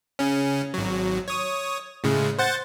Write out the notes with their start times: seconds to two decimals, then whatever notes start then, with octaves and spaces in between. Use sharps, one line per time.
0.19 C#3 C#4
0.74 G#1 F#3
1.28 C#5 D#6
2.04 A2 C#3 G#3
2.39 C5 F#5 A6